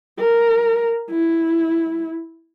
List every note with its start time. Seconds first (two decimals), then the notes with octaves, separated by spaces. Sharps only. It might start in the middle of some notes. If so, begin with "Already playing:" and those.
0.19 A#4
1.11 E4